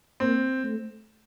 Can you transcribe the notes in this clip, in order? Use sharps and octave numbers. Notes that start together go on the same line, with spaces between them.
A#3 C4
A3